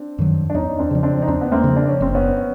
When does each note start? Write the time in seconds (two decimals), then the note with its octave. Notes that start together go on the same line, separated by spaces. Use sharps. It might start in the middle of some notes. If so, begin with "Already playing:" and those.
Already playing: C4 D4
0.18 F#2 D#3 F#3
0.50 D4
0.54 E2 C#4 D#4
0.79 C4 D4
0.91 C#3 F3
1.03 C4 D4
1.22 D#4
1.28 E2 C4 D4
1.41 B3
1.52 A#3 C4
1.64 C#3 F3
1.77 D4
1.89 C#4
2.01 F#1 C4
2.15 B3 C#4